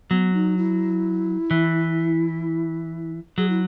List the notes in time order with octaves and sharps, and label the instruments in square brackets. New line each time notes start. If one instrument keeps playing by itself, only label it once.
[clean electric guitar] F#3 [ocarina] B3
[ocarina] D#4
E4
[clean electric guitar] E3
[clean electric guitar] F#3 [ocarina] G#4
[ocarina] E4